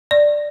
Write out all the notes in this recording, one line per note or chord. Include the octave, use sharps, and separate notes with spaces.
D5